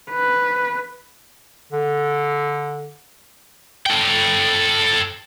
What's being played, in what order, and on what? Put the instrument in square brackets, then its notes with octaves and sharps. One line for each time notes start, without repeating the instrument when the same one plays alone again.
[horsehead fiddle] B4
[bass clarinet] D3
[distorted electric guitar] A4 G5